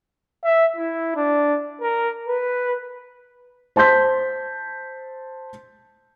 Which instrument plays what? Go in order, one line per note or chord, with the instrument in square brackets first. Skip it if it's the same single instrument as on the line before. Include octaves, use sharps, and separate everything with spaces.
[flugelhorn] E5
E4
D4
A#4
B4
[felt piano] C5 A5 C6 G6 B6